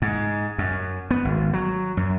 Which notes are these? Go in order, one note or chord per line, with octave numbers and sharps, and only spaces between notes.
G#2
F#2
B3
G#1
F#3
F#2